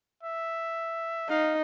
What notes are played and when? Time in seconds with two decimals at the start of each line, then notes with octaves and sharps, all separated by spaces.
0.23 E5
1.30 D#4 F5